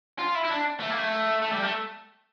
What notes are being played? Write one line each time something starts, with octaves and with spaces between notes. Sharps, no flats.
F4
E4
E4
D4
A3
A#3
A3
A3
G3
A3